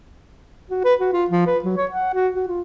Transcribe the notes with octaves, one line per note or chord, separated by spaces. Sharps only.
F#4
B4
F#4
F4
F3
B4
F#3
C#5
F#5
F#4
F#4
F4